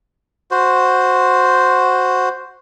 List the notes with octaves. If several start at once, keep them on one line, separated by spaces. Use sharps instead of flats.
F#4 C5